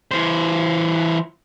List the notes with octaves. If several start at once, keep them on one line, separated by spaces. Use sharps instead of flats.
E3 C5